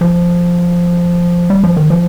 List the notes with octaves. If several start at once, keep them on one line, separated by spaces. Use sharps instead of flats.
F3
G3
F3
D#3
F3